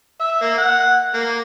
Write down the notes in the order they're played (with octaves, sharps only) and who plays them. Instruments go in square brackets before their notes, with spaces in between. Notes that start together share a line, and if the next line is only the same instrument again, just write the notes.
[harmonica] E5
A#3
F#5
A#3